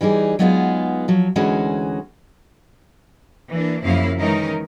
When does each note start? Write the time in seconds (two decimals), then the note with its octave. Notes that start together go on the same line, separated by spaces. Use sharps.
0.01 E3 G3 D#4 G#4
0.39 F#3 G#3 B3 D#4 F4 G#4
1.08 F3 F#3
1.36 D2 E3 G#3 C#4 F#4
3.50 E3 A#3 D4
3.83 F#2 C#3 F3 A#3 E4 F5
4.19 D#3 E3 G#3 C#4 D#4 A#4